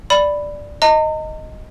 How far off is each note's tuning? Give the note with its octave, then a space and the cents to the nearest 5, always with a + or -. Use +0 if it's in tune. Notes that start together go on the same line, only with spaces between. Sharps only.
D5 +0 B5 +0
D#5 +0 A#5 -40